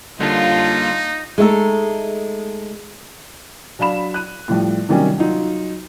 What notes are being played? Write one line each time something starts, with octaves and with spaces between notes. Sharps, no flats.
D3 G3 A#3 D#4 F4 C#5 A5
G#3 A3 D#4 A4
F#3 D4 F5 B5 E7
F#6 D#7
A2 F3 G3
C3 D#3 F#3 G3 A#3 C#4
F#3 D#4 F4